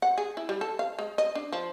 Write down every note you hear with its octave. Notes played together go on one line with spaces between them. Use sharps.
F#5
G#4
E4
G3
A4
F5
G#3
D#5
D4
F3